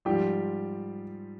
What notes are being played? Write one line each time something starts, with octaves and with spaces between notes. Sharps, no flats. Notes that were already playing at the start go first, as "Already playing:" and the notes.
G#2 F3 G3 G4